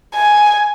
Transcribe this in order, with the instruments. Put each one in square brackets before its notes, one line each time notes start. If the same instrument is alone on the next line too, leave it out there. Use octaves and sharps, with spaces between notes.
[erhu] G#5